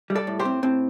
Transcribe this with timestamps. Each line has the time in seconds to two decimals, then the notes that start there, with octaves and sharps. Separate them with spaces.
0.10 G3
0.15 A4 D5
0.27 A2
0.39 G4 C5
0.45 C4
0.63 A2 C4